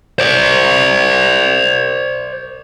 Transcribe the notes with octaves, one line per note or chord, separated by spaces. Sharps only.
C5 D5